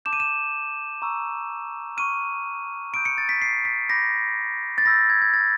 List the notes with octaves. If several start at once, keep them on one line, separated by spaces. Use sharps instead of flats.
A5 D6 G6 E7
D#7
E7
A#5 C#6 E6
C#6 F6 D#7
B5 D#6 G6 D7
C#7
A6
B6
C7
B6
B5 D6 G6 A#6
A6
B5 E6 G6 A#6
G#6
G#6
A6